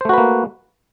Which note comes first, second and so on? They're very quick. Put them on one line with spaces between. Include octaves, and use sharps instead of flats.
C5 A3 F#4 B4 A#3